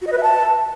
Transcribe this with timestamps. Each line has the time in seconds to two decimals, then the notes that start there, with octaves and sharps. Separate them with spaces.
0.02 F#4
0.07 D#5
0.12 B4
0.18 E5
0.23 A5